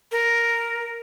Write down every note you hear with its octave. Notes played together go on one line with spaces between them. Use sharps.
A#4